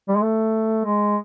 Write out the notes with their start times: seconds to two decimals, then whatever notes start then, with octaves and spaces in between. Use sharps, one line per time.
0.09 G3
0.16 G#3
0.23 A3
0.85 G#3